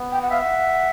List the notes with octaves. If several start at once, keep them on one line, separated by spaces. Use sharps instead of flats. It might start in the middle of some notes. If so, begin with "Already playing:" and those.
Already playing: B3
G5
F#5
E5 F5
F#5